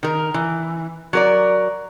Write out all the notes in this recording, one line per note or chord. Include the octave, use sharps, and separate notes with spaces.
D#3 A#4
E3
F#3 A#4 D5